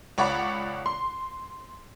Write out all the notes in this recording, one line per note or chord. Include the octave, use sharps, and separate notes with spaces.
C#2 C#5 D5 F#5 B5
C6